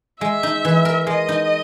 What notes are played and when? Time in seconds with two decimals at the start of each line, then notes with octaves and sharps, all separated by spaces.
0.21 G#3 E5
0.43 D#4
0.65 E3
0.85 A#4
1.07 G#3 D#5
1.29 D#4